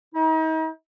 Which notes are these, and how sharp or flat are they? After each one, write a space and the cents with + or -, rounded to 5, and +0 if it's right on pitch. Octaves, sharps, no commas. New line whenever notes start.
D#4 +40